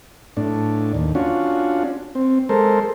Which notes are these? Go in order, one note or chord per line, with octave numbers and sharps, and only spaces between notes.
A2 D4
D#2
C#4 D4 F4 F#4
C4
G#3 A4 A#4 C5